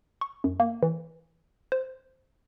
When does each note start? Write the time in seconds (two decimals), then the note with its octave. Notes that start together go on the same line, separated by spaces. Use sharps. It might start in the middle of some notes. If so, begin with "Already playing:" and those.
0.21 C#6
0.44 F#2
0.60 A#3
0.83 E3
1.72 C5